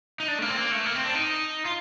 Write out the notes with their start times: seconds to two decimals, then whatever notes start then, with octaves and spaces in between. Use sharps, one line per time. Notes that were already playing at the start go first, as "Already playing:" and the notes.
0.20 D#4
0.28 D4
0.39 A3
0.42 A#3
0.50 C4
0.57 A#3
0.72 A3
0.86 A#3
0.95 C4
1.05 D4
1.15 D#4
1.65 F4